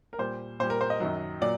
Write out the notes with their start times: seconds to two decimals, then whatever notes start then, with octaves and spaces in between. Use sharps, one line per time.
0.13 A#4
0.18 A#2 G3 C5
0.60 A#2 C5
0.63 G3
0.70 A#4
0.81 C5
0.90 D#5
1.00 F#2 D#3 F#3
1.41 A#2 F#3 D5